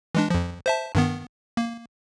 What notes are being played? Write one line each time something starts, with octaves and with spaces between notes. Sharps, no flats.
E3 G#3 D4
F2 F3
C5 E5 A5
G2 D#3 B3
A#3